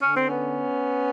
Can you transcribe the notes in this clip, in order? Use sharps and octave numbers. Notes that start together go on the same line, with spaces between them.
D3 C#4
C4
B3 C#4